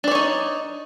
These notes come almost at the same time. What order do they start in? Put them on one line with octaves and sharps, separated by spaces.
D4 D5 C#5 D#4